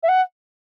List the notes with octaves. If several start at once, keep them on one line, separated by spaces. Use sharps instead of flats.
E5
F#5